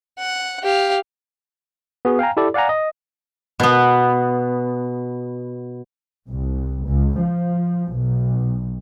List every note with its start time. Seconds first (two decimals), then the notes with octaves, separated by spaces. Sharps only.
0.19 F#5
0.63 G4 F5
2.05 B3 F#4 G#4
2.19 F5 G5 G#5 A#5
2.37 E4 G4 A4 D5
2.54 D5 F5 F#5 G#5 A#5
2.69 D#5
3.60 B2 B3
6.29 C2
6.87 C#2
7.19 F3
7.94 B1